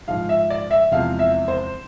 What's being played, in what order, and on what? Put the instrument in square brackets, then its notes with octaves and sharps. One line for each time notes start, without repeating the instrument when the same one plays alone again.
[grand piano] G#2 F3 G#3 F5
E5
D5
E5
E2 C3 F3 G#3 F5
E5
C5